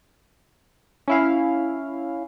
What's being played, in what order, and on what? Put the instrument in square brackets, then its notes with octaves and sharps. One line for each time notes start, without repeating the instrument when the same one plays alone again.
[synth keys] C#4 E4 F5